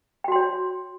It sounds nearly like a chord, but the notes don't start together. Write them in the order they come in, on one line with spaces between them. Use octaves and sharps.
G5 F#4 C6 C#5